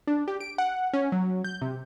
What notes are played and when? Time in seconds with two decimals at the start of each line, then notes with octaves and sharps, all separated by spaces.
0.07 D4
0.28 G4
0.41 D7
0.58 F#5
0.93 C#4
1.12 F#3
1.44 G6
1.62 C3